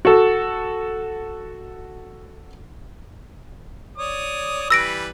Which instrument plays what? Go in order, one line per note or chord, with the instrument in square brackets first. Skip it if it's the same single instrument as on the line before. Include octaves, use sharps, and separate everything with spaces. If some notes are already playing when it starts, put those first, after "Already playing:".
[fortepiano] F#4 A4
[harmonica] C#5 D5 D#6
[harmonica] E3 G3 B4 [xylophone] E6 A#6 D7